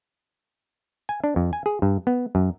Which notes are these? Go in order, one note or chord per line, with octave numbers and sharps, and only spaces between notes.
G#5
D4
F2
G#5
G#4
G2
B3
F#2